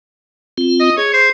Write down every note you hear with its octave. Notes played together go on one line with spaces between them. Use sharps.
C4 F4
D#5
G#4 C#5
C5